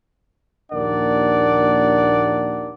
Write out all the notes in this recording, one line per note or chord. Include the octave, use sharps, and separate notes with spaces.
A#1 D#2 D4 A#4 D5 F#5